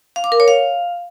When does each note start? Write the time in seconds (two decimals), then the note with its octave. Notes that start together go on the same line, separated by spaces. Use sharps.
0.16 F5
0.24 D6
0.32 A#4
0.40 C#5
0.48 F5